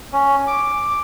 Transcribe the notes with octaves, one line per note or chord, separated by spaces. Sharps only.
C#4
D6